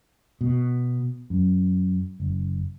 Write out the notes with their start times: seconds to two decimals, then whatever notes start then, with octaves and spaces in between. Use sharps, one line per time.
0.41 B2
1.30 F#2
2.20 F#1